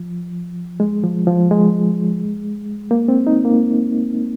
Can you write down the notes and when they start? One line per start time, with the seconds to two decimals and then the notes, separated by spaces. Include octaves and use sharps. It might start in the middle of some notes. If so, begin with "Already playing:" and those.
Already playing: F3
0.80 G#3
1.03 F3
1.27 F3
1.51 G#3
2.91 A#3
3.08 C4
3.27 D#4
3.45 A#3